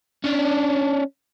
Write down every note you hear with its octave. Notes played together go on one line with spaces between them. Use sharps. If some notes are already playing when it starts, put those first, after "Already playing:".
C#4 D4